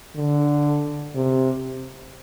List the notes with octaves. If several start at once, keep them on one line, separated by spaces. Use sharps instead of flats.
D3
C3